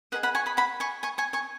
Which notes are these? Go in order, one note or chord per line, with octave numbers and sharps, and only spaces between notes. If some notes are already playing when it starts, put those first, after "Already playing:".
G#4 B4 D#5 F#5
F#5 B5
G#5 C#6
B5 D#6
F#5 B5
G#5 C#6
G#5 C#6
G#5 C#6
G#5 C#6